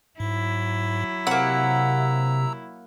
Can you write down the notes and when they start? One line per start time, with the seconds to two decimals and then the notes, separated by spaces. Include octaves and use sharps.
0.20 G#2 F#3 E4
1.27 C3 A#3 F#5 A#5 E6